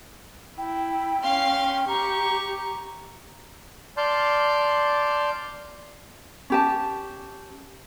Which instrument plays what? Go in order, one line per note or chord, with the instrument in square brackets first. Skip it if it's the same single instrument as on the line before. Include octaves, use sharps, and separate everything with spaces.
[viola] E4 [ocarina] G5
[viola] C#4 [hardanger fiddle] F5 C6
[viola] G4 [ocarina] A#5 [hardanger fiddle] C#6
[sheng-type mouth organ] D5 A5 C6 F6 G6
[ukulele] C#4 G4 A5